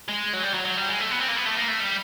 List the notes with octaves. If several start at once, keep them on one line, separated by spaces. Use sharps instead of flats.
G#3
F#3
G3
F#3
F#3
G3
G#3
A3
B3
C4
A#3
B3
A3
A#3
A3
G3